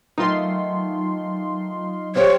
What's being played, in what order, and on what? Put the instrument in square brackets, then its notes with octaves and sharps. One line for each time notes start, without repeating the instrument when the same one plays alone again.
[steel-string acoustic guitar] D#3 A3 [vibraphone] F#3 [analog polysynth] D#4 F4 C6
[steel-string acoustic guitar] G4 C5 F5 [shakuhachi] C#5